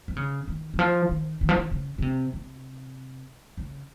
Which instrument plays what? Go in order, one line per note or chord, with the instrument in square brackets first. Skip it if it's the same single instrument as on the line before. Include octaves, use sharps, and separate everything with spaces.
[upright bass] D#3
C#3
D#3
D#3
F3
D#3
D#3
F3
D#3
C#3
C#3
C3
C3
C#3